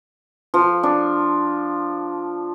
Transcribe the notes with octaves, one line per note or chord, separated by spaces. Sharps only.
F3
D4